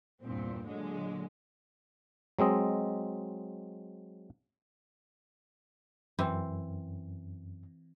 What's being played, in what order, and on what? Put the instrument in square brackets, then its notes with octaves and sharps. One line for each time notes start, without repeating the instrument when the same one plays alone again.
[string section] E2 G2 A#2 C4
A#2 D3 F#3 G#3
[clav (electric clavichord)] F#3 G#3 C4 D#5
[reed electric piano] F#2 [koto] E3 C4